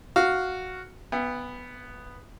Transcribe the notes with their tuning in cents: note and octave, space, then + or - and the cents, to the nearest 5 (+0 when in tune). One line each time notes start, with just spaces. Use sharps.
F#4 +0 F5 +0
B3 +0 E5 +30 G5 +40